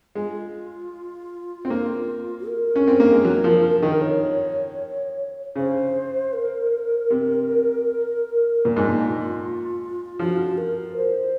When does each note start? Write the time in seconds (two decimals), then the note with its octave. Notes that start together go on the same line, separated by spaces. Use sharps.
0.15 G#3 F4
1.65 C4
1.70 A#3
2.47 A#4
2.76 C#4
2.88 C4
3.00 A#3
3.12 G#3
3.25 F#3
3.44 F3
3.82 D#3
4.01 C#5
5.56 C#3 C5
6.33 A#4
7.10 C3
8.65 A#2 F4
8.76 G#2
8.88 A#2
10.19 F3 F#4
10.57 A#4
10.96 C5